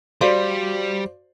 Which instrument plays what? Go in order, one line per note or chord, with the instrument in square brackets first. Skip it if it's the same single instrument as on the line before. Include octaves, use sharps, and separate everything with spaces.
[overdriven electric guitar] G3 [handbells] F#4 F5 C6 [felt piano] C5 D5